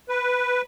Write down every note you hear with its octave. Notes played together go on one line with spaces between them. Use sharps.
B4